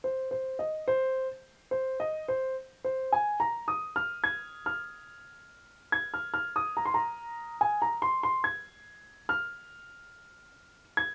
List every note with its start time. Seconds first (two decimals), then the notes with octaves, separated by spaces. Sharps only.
0.04 C5
0.31 C5
0.59 D#5
0.88 C5
1.71 C5
2.00 D#5
2.28 C5
2.84 C5
3.12 G#5
3.40 A#5
3.68 D#6
3.96 F6
4.24 G#6
4.66 F6
5.92 G#6
6.14 F6
6.34 F6
6.56 D#6
6.77 A#5
6.85 C6
6.94 A#5
7.61 G#5
7.82 A#5
8.02 C6
8.23 C6
8.44 G#6
9.29 F6
10.97 G#6